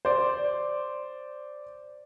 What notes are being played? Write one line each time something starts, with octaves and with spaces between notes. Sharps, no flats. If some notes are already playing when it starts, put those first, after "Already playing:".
C5 D5